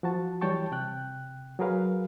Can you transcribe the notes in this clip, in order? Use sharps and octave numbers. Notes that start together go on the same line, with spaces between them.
F3 F#4 A5
E3 G3 C#5 G5 A5 C#6
C3 G5 F#6
F#3 F#4 G#4 A#4 B4 F5